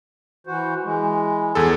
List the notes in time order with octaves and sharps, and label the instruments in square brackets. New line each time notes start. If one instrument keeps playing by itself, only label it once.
[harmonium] E3 F#4 C5
E3 G#3
[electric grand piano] E2 G#4 A4